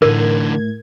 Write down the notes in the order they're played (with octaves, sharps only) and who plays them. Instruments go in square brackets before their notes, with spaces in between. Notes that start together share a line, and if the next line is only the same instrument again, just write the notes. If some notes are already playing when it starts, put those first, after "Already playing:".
[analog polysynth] A2 G#6 [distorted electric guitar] D3 E3 [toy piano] A#4